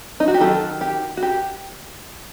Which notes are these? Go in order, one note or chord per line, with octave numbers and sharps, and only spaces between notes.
D#4
F#4
G4
D#3 F#3 A4
G4
F#4
G4